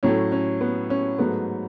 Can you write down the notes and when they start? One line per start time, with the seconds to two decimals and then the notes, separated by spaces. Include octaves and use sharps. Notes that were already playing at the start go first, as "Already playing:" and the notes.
0.03 A2 F#3 A3 C#4
0.32 C#4
0.61 B3
0.90 C#4
1.19 G#2 F#3 A3 B3